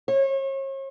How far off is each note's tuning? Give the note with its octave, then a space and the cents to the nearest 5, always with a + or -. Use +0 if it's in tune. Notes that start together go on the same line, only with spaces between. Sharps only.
C#5 -40